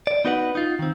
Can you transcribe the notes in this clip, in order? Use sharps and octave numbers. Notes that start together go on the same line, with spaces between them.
D5
B3 D#4 F#4 B4 C#5 F#5
D#4 F4
D#3 C4